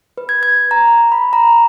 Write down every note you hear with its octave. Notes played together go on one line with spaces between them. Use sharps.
B4
G#6
G#6
A#5
B5
A#5